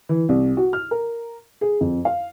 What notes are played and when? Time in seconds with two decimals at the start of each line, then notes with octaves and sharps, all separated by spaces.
0.09 E3
0.29 C2
0.57 F#4
0.73 F6
0.91 A#4
1.61 G#4
1.81 F2
2.05 F5